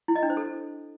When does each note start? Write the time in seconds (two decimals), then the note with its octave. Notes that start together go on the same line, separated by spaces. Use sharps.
0.08 E4
0.15 D#5
0.23 D4
0.30 C5
0.37 A4